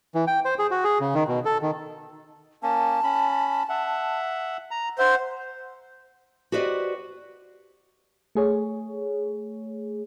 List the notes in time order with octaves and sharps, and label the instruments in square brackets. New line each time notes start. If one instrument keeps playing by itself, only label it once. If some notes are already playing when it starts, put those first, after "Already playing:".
[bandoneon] E3
G5
C5
G#4
F#4
G#4
C#3
D#3
B2
A4
D#3
[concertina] A#3 C#4 [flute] A5
[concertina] C#4 B5
E5 F#5
A#5
[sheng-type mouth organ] C5 [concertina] E5 C6 [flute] F#5
[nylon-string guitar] F#4 G4 B4 C5 D5 D#5
[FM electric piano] A3 G#4 C#5